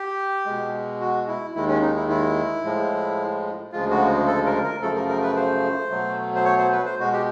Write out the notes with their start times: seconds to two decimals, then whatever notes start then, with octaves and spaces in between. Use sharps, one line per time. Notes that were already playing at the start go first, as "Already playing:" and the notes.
Already playing: G4
0.46 B2 G#3
1.00 F#4
1.28 E4
1.55 D#2 D#3 G#3 E4
1.68 C#4
1.82 D#4
1.96 E4
2.09 E4
2.64 A2 F3 G#3
3.72 D2 C#3 F3 G#3 F4
3.91 F#4
4.27 A4
4.45 A#4
4.63 A#4
4.81 F#2 C#3 F3 A3 A4
4.95 A#4
5.09 A#4
5.22 B4
5.36 C5
5.90 B2 F#3 A3
6.35 C5
6.45 C#5
6.58 C5
6.72 B4
6.86 C5
6.99 B2 G#3 F#4
7.13 G4